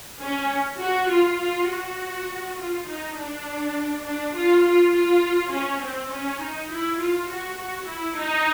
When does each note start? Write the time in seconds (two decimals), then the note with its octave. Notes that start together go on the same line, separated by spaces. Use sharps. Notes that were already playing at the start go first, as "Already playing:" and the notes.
0.21 C#4
0.80 F#4
1.10 F4
1.39 F4
1.69 F#4
2.58 F4
2.87 D#4
3.17 D4
4.05 D4
4.34 F4
4.64 F4
4.94 F4
5.52 C#4
5.82 C4
6.11 C#4
6.41 D#4
6.70 E4
6.99 F4
7.30 F#4
7.58 F#4
7.88 E4
8.17 D#4